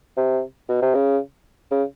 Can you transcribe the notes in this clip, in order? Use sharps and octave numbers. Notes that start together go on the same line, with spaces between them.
C3
B2
C3
C#3
C#3